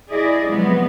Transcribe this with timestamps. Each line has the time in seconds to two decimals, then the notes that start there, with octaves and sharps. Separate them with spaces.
0.10 E4 G#4 D5 D#5
0.47 C3 F3 F#3 G#3 B3